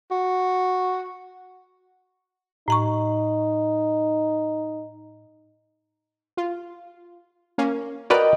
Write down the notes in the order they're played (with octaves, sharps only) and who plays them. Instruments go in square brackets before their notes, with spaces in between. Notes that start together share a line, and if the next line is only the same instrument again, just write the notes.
[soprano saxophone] F#4
[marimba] A2 A#5 C#6 [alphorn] D#4
[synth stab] F4
A#3 C#4
[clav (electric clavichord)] F#4 A#4 B4 [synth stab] D5 [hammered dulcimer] D#5 G5